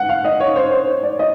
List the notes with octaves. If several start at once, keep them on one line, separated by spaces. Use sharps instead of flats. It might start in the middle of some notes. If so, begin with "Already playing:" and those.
Already playing: F#5
F5
D#5
C#5
C5
C5
C#5
D5
D#5